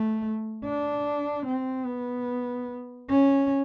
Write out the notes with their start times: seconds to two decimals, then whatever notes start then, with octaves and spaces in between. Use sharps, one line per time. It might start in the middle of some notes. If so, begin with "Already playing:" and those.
Already playing: A3
0.65 D4
1.46 C4
1.86 B3
3.09 C#4